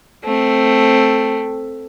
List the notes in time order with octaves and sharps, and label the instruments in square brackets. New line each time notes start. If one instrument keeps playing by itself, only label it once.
[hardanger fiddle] A3 C4